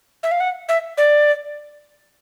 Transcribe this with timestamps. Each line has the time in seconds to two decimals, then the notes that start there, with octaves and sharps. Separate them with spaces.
0.23 E5
0.31 F5
0.40 F#5
0.69 E5
0.98 D5